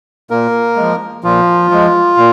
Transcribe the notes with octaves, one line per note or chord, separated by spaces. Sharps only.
A#2 A#3 A#4
F3 G#3
A#2 F3 F4
F3 G#3
A#2